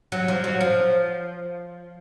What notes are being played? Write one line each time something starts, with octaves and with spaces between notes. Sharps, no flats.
F#3
F3
F#3
F3